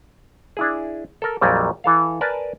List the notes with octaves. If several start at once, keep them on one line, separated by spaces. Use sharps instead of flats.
D4 E4 G#4
A4 A#4
A#1 F2 A#2 F#3 G3
E3 A4 F5
A#4 B4 D5 G#5 A5